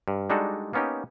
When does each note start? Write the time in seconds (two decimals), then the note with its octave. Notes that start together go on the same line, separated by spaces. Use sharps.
0.08 G2
0.30 G3 G#3 D4 D#4 F#4 A4
0.73 A#3 B3 C#4 D#4 G4